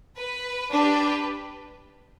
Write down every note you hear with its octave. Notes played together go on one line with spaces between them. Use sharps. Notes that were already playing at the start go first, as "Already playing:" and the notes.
B4
D4 G4 B4